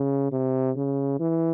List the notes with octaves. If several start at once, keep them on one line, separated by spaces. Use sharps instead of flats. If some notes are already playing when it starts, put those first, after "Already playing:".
Already playing: C#3
C3
C#3
E3